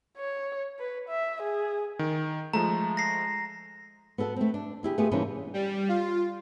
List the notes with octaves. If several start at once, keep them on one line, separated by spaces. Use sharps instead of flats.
C#5
B4
E5
G#4
D#3
F3 G#3 A3 A#5
A#6 C7
B3 F#4 A4 F#5
A3 C4
D4
D3 E4 G4 G#4
A3 B3 F4 G4 G#4
C3 E3 G3 A#3 C#4 D4
G3
F4